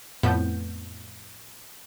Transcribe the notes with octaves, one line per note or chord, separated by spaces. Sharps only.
F2 A2 B3 G6